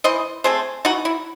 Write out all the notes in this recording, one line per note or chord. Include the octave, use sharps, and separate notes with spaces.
E3 C5 D#5
A3 C4 G#4 C5
E3 D#4 F#4
E4